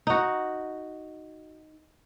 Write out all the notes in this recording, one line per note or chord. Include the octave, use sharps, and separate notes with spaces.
D#4 F#4